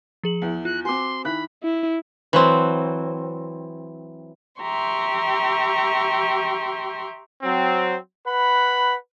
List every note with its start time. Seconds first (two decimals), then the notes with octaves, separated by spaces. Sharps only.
0.23 F3 G#4 F#7
0.42 E2 E4
0.65 F4 F#6
0.85 C4 F#4 G#5 C6 D6
1.25 D#3 E4 B5 F#6
1.63 E4
2.33 E3 F#3 C4
4.61 G4 E5 G5 A#5 C6 C#6
7.43 F#3 C4
8.27 B4 F#5 B5